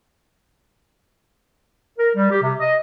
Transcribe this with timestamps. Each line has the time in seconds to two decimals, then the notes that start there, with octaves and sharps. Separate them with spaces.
1.98 A#4
2.15 G3
2.30 G4
2.42 C3
2.59 D#5